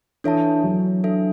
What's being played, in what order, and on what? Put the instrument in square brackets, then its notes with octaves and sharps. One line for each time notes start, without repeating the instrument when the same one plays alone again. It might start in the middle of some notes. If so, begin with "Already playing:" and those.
[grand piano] E3 [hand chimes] D4 A4 C#5 E5 A5
[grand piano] F#3
[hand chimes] D4 A4 E5